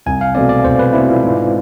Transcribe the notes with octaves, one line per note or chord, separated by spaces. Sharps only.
C2 G#5
F5
B2 A3 C4 D5
D5
C2 C5
B4
B2 A3 C4 E4
F4
G#2